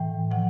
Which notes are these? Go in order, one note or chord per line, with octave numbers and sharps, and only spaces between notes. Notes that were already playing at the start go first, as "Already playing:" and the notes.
Already playing: A2 E3 G5
C3 F3 F#5